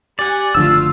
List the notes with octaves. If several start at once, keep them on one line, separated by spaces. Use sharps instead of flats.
G4 D5 F#5 G#5
F#1 D3 F3 A3 F4 E6